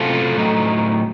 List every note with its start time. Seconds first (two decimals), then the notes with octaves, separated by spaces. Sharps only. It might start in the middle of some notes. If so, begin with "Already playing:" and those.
Already playing: C3 F#3 A3 C#4 F4 A4
0.37 A2 F#3 A3 D#4